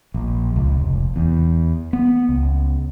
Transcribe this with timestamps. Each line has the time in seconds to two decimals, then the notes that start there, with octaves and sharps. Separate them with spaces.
0.14 A#1
0.56 C#2
0.80 F1
1.16 E2
1.93 B3
2.29 C#2